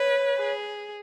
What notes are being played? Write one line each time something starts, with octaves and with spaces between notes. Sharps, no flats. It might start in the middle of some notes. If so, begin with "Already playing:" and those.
Already playing: B4 C#5
G#4